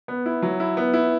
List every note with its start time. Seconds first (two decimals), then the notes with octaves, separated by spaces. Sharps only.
0.08 B3
0.26 E4
0.42 F#3
0.60 E4
0.77 B3
0.94 E4